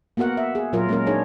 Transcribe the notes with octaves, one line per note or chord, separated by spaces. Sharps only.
A#3 B3 F#4 A#4 F#5
E5
G#4
A#2 F#3 F4 A#4
G#3 A#3 C#4 A#4
D4 D#4 G#4 C#5